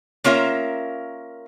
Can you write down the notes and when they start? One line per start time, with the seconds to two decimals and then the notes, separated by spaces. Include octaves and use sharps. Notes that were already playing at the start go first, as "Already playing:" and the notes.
0.24 A#3 C#4 F4 A#4 E5